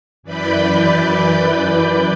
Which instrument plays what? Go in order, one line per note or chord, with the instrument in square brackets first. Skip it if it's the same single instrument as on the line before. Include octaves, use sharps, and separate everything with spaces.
[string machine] F#2 E3 B4 D5 B5 G6